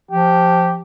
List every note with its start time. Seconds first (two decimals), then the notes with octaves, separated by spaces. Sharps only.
0.11 F3 G4